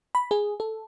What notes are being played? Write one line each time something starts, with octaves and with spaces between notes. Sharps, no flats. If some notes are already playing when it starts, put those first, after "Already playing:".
B5
G#4
A4